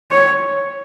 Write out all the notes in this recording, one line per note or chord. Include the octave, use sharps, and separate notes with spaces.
C#5